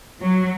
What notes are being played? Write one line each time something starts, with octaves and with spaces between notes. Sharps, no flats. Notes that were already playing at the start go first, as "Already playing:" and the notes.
F#3